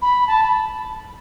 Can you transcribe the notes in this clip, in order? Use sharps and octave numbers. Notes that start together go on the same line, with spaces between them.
B5
A5
B5